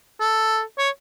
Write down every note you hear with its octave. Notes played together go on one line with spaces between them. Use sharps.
A4
C#5